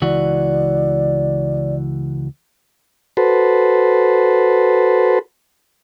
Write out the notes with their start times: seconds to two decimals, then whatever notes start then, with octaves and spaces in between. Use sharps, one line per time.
0.02 C#2 E3 F#4 D5
3.17 F#4 A4 B4 C5